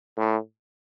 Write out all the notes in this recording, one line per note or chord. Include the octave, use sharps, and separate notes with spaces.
A2